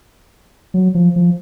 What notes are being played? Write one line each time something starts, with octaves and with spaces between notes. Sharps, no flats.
F#3
F3
F3